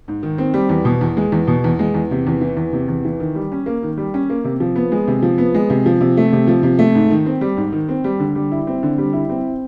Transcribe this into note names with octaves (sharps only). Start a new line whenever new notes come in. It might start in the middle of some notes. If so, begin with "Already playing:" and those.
G#2
D#3
C4
G3
E2
B2
E2
G#3
E2
B2
E2
G#3
E2
C3
E2
E3
E2
C3
E2
E3
D#3
G3
C#4
A#3
D#3
G3
C#4
A#3
C3
F3
B3
G#3
C3
F3
B3
G#3
C3
F3
C3
A3
C3
F3
C3
A3
G#2
D#3
C4
G3
G#2
D#3
C4
G3
D3
G3
E4
C4
D3
G3
E4
C4